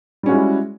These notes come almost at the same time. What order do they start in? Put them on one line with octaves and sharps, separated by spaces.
G3 C#4 F#4 G#3 E4